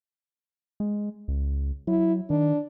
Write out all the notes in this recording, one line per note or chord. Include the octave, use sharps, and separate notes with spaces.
G#3
C#2
F#3 E4
D#3 D4